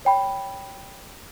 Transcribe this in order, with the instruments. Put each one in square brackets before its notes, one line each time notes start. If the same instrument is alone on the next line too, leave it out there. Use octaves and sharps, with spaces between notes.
[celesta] C#5 G5 B5